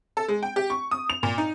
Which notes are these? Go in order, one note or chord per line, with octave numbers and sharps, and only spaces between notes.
A4
G#3
G5
G4
C#6
D#6
F7
A#2
D#4